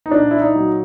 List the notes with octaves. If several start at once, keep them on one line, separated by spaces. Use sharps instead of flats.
D#4
A#2 D4
E4
D#4
F#3